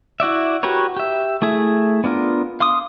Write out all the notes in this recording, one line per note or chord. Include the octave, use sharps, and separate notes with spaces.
E4 F#4 D5 E5
F#4 G4 A#4 B4 C#5
G4 E5
A3 E4 G#4 E5
B3 D4 F4 A#4
F5 C6 D6 D#6